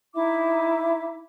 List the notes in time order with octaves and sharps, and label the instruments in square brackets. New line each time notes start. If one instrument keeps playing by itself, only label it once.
[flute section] D#4 E4 E5 D6